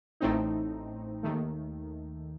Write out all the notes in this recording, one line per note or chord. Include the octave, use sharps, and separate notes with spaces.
A1 A2 A3 C4 D#4
D#2 D#3 A3